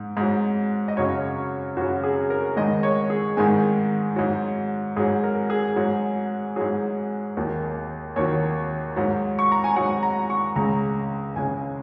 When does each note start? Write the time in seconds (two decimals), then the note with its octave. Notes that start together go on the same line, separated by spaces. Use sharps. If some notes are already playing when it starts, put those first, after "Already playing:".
Already playing: G#2
0.17 G#2 F#3
0.88 D#5
0.97 F#2 C#3 F#3 C#5
1.77 F#2 C#3 F#3 F#4
2.03 G#4
2.30 A#4
2.57 G#2 D#3 G#3 D#5
2.83 C#5
3.10 G#4
3.37 G#2 D#3 G#3 G#5
4.16 G#2 F#3
4.96 G#2 F#3 G#4
5.24 A#4
5.50 G#4
5.76 G#2 F#3
6.56 G#2 F#3 G#4
7.37 D#2 D#3 F#3
8.16 D#2 D#3 F#3 C#5
8.96 G#2 F#3
9.39 C#6
9.52 A#5
9.64 G#5
9.76 G#2 F#3 F#5
10.03 A#5
10.30 C#6
10.56 C#2 C#3 G#3 A#5
11.36 C#2 C#3 G#3 G#5